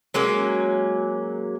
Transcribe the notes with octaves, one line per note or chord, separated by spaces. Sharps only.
F#3 G#3 A#3 C#4